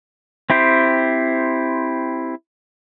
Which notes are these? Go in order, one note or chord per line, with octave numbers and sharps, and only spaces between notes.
C4 E4 G4 C5